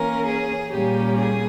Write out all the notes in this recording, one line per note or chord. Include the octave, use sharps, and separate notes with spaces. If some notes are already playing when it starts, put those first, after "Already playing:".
Already playing: E3 A#3 C#4 A#4
G#4
A#2 G3 A#3 C#4 G4
G#4